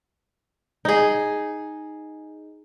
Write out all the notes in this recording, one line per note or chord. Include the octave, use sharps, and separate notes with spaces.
D#4 G#4